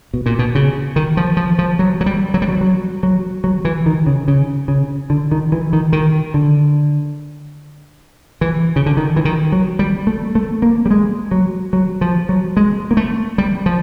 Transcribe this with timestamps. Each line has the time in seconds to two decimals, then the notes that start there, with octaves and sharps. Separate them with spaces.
0.14 B2
0.26 A#2
0.39 B2
0.55 C#3
0.96 D#3
1.17 F3
1.37 F3
1.59 F3
1.79 F#3
2.01 F#3
2.06 G3
2.34 F#3
2.42 G3
2.48 F#3
2.61 F#3
3.03 F#3
3.44 F#3
3.65 E3
3.86 D#3
4.07 C#3
4.28 C#3
4.68 C#3
5.10 D3
5.31 D#3
5.52 E3
5.73 D#3
5.93 D#3
6.34 D3
8.41 E3
8.76 C#3
8.86 D3
8.97 D#3
9.16 E3
9.25 D#3
9.52 F#3
9.79 G3
10.07 A3
10.35 A3
10.62 A#3
10.86 G3
10.91 G#3
11.31 F#3
11.73 F#3
12.01 F3
12.29 F#3
12.57 G#3
12.91 A#3
12.97 A3
13.38 G3
13.66 F3